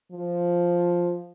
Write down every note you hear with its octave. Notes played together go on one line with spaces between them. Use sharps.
F3